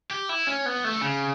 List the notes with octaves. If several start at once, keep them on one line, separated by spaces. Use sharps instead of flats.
G4
E4
C#4
B3
A3
C#3